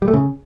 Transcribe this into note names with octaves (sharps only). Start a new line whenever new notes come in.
G3
A3
C#3